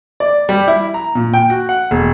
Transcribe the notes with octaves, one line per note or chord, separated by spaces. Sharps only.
D5
G3
E4
A#5
A#2
G5
F#4
F#5
E1